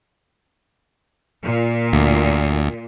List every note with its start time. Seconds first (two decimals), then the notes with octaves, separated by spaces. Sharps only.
1.43 A#2
1.92 D2